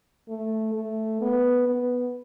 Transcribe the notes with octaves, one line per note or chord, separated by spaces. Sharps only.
A3
A3
B3
B3